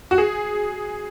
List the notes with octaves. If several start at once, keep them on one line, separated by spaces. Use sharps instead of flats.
F#4
G#4